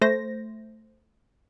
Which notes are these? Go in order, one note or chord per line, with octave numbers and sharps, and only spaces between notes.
A3 C5 A#6